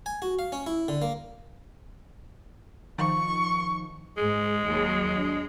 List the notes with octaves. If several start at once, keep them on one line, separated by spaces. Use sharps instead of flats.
G#5
F#4
F5
C#4
E4
D3
A#3
D#3 F3 C#6
G#2 G#3 G#4
D#2 F#3
D4